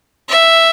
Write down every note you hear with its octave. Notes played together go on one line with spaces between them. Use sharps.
E5